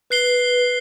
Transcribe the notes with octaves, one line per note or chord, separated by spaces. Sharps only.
B4 F#6 C7 G7